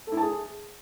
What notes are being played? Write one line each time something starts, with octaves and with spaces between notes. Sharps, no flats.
A4
E4
A5
G#4